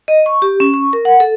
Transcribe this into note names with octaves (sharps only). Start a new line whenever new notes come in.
D#5
C#6
G4
C#4
C#6
A#4
F#5
A4